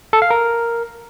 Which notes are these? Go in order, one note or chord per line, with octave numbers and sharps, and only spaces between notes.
A4
F5
A#4